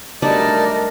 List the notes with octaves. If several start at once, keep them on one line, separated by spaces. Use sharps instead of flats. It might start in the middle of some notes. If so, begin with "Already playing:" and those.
F#3 G3 A3 D4 D#4 A#4 D5 A5